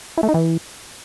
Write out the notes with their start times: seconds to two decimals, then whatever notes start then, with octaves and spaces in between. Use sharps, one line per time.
0.17 E4
0.23 A3
0.29 D#4
0.34 E3